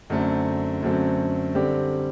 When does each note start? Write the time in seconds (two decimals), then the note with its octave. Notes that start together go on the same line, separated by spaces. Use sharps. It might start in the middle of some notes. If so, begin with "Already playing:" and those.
0.10 F#2 D3 F#3 A3 C4
0.83 F#2 D3 F#3 A3 C4
1.55 D3 G3 C4 G4